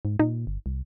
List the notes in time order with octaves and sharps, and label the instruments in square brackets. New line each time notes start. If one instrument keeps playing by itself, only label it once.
[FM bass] G#2
[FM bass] A#2 [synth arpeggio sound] D#4
[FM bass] G1
C2